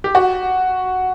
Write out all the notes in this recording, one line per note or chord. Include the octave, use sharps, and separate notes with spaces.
G4
F#4